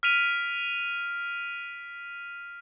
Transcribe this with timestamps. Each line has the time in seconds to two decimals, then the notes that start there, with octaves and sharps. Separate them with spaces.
0.03 F6 B6 D7 D#7 F7